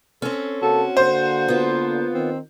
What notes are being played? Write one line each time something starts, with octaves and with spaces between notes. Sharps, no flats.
C4 C#4 A4
C#3 A#3 F#4 A4
D3 A#3 C5
B3 F4
D#3 C4